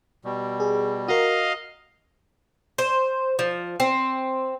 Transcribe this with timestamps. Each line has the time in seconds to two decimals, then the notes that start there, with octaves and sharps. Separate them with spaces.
0.25 B2 G3
0.60 G#4
1.08 F#4 A#4 D#5 F5
2.78 C5
3.39 F3
3.80 C4